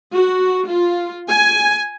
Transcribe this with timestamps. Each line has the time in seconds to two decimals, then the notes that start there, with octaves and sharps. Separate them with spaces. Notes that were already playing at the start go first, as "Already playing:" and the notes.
0.14 F#4
0.68 F4
1.30 G#5